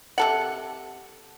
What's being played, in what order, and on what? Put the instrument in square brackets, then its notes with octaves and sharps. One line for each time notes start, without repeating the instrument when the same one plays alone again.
[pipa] C3 A4 F#5